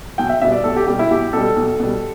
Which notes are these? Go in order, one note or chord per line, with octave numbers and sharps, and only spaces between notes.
B1 G5
E5
B2 G3 E5
D5
B1 A4
G4
B2 G3 G4
E4
B1 G4
B2 G3 A4
B1
B2 G3